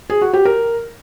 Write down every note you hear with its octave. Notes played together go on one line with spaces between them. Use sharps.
G#4
F#4
G4
A#4